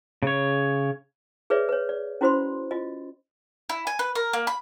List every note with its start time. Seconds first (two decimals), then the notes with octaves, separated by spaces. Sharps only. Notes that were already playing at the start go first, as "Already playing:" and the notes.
0.23 C#3 C#5
1.50 G#4 B4 C#5 D5 E5
1.69 B4 C#5
1.89 D5
2.21 C#4 E4 F#4 C5 B5 C6
2.71 F4 D#5
3.69 E4
3.87 G#5
3.99 B4
4.15 A#4
4.33 A#3
4.47 B5